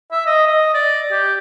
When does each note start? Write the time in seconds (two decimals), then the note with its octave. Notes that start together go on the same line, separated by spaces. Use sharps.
0.12 E5
0.27 D#5
0.48 D#5
0.74 D5
1.12 G4